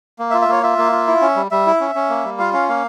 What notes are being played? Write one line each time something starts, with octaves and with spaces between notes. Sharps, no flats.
A#3
E5
F4
E5
A#3 C#5
F4 E5
A#3
F4
E4
C#4
G3
G3 E5
E4
C#4
C#4
A#3
G3
F4 F5
C#4 F5
A#3 F5